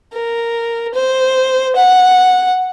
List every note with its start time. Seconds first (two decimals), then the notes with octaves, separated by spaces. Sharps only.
0.13 A#4
0.94 C5
1.76 F#5